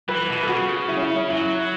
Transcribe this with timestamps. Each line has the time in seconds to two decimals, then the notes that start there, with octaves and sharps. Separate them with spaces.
0.09 E3 B4
0.28 B2
0.43 A4
0.48 C#3 F#4
0.88 E4
0.97 C#4
1.02 E4
1.16 C#4
1.29 F#3 E4